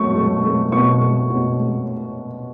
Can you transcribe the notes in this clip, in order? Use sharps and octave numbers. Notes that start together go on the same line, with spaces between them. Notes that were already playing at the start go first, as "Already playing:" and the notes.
Already playing: B2 F#3 A3 C#6
A3
A3
B2 C#6
A3
B2
A3